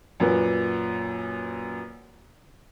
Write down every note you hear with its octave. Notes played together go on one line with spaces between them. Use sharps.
F#2 A#2 B4